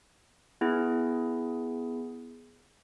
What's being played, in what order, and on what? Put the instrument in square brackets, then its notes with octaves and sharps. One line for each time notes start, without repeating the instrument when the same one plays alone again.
[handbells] B3 E4 G#4